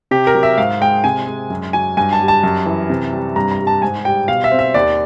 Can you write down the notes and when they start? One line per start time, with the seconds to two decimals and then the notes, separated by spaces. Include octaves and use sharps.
0.11 C3 G4
0.27 A#4
0.35 F#3
0.43 E5
0.57 G#2 F5
0.80 G#3 G5
1.04 C3 G#5
1.27 G#3
1.50 F#2
1.73 F#3 G#5
1.97 G2 G#5
2.13 A5
2.20 G3
2.28 A5
2.43 F#2
2.66 E3
2.90 C3
3.13 G3
3.36 G2 A#5
3.51 A#5
3.59 G3
3.67 A5
3.82 G#2 G#5
4.05 G3 G5
4.28 B2 F5
4.44 E5
4.51 C4
4.59 E5
4.74 D#2 D5